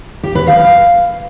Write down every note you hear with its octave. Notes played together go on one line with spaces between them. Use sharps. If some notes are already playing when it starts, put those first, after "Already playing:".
G4
B4
F5